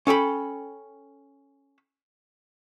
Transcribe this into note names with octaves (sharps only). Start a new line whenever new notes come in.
C#4 A4 G5 B5